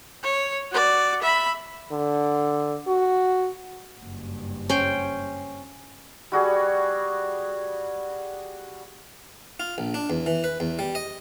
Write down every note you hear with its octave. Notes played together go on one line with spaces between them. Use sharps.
C#5
F#4 D5
E5 B5
D3
F#4
F#1 G2
C#4 C5 G5
G3 F#4 G#4
F4
A#1
D4
E2
E3
B4
E2
G3
D#5